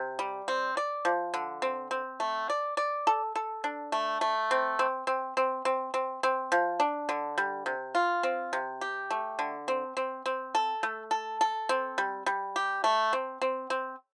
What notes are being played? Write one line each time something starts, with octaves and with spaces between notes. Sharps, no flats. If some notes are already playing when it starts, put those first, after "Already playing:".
Already playing: C3
G3
C4
D5
F3
D3
C4
C4
A3
D5
D5
A4
A4
D4
A3
A3
C4
C4
C4
C4
C4
C4
C4
F3
D4
D3
G3
C3
F4
C4
C3
G4
A3
D3
C4
C4
C4
A4
A3
A4
A4
C4
G3
G3
G4
A3
C4
C4
C4